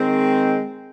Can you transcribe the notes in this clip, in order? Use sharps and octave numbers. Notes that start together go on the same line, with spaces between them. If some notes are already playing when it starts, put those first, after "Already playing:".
Already playing: D#3 G#3 C4